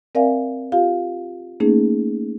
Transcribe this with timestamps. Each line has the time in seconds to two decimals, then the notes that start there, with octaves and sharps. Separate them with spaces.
0.15 C4 A#4 D5 E5 F5 G#5
0.72 F4 G4 F5
1.60 A3 A#3 C#4 D#4 G#4